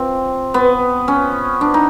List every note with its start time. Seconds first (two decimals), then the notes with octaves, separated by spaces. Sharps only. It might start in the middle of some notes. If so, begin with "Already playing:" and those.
Already playing: C4 F4
0.54 B3
1.08 C#4
1.61 D4
1.74 D#4